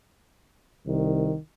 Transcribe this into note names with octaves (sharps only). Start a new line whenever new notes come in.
C2 D#3